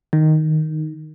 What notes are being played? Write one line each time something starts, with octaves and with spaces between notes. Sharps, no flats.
D#3